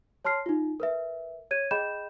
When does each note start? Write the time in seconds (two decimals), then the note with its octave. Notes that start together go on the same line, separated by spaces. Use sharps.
0.25 C#5 A5 C6 F6 C7
0.46 D#4 F4
0.80 A#4 B4 E5
1.51 C#5 G#6 D#7
1.71 G#4 D#5 G5 B5 G6 E7